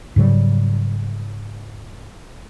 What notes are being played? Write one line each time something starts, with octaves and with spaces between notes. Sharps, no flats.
G#2 C#3 F#3 G3